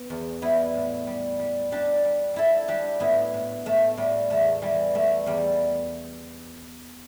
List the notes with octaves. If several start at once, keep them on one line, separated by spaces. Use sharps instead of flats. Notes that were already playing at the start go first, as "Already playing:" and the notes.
Already playing: B3
E2
G3 B3 E4
A2
G3
G3
G3 D4 G4
G3
G3 E4 A4
G3 D4 G4
A2 B3 E4
A2
A2 A3
A2 G3
E2 A3
E3 G3
G3 A3
E2 G3